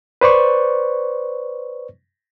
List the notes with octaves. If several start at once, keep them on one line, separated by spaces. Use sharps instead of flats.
B4 C5 D5 C#6